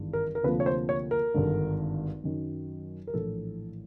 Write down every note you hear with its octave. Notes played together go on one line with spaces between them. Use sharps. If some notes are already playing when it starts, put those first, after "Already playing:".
Already playing: G#1 G2 E3 G#3
A#4
A#4
D2 C3 F3 A#3 B4
C#5
C5
C#5
A#4
G#1 G2 D3
F#2 D#3 F#3
A#4
A#1 A2 E3 A4